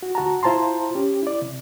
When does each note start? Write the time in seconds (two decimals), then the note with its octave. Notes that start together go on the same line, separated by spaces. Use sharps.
0.03 F#4
0.15 D2 F#4 A5 A#5
0.43 E4 F4 C5 A5 A#5 C6
0.95 C#4 G4
1.22 E4 D5
1.42 C3